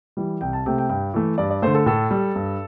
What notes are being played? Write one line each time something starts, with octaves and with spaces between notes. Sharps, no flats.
E3 G3
C2 G5
A5
C3 A3 G5
G5
G2 G5
E3 A3
G2 D5
D5
D3 A3 C5
A4
A2 A4
G3
G2